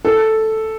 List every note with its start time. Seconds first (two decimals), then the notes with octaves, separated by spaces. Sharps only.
0.05 A4